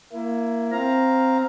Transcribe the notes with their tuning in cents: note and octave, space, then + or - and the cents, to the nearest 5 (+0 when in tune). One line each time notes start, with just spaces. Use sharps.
A#3 +0 E4 +20
C4 +0 F5 +0 A#5 +0